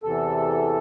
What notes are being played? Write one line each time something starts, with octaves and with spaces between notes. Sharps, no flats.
E2 C3 E3 A4